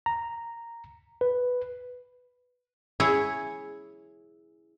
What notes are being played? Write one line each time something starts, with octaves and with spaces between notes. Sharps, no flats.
A#5
B4
E4 G#4 C#5